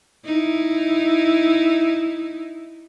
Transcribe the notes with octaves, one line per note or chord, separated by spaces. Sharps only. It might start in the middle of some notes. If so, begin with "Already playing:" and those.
D#4 E4